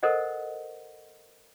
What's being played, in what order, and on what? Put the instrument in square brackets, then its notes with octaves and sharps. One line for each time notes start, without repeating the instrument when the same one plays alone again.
[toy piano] A4 A#4 C5 D#5 F#5